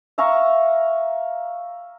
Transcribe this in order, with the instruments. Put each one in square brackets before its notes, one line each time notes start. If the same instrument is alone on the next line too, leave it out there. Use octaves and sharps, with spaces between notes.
[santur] E5 F5 A#5 C#6